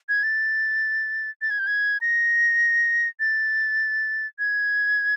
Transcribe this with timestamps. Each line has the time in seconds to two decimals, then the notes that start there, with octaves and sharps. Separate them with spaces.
0.09 G#6
0.23 A6
1.41 A6
1.50 G#6
1.59 G6
1.67 G#6
2.01 A#6
3.20 A6
4.39 G#6